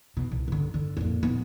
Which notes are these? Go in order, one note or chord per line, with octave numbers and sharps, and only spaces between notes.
B2
C2
G2 D3
D3
F2 A#2
D#1 B3